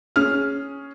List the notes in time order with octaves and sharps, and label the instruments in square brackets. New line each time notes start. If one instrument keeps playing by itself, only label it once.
[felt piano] C#4 G#4 F6